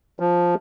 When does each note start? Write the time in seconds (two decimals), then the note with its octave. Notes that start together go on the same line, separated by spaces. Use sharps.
0.20 F3